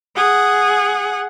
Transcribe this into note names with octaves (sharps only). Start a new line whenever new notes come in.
G#4 F#5